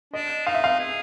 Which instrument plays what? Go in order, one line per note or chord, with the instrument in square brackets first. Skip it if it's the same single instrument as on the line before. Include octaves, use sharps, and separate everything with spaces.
[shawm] D4 [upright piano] D#5
[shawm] D#4 [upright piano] F5
[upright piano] E5
F5
[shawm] G#4